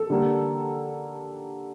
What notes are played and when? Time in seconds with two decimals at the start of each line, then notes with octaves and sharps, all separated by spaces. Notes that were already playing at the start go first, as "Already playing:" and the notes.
Already playing: A4
0.10 D3 G3 A#3